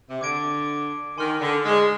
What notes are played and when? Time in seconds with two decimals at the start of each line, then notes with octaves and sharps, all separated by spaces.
0.10 C3
0.21 D3 D6 G#6 D7
1.18 D#3 G#5 C6 F6
1.41 D3
1.66 G#3